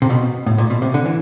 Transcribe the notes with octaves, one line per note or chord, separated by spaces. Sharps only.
C3
B2
A2
A#2
B2
C3
D3
E3